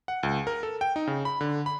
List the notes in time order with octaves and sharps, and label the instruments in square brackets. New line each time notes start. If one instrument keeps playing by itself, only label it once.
[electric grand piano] F#5
C#2
A#4
A4
G5
D#4
C#3
B5
D3
B5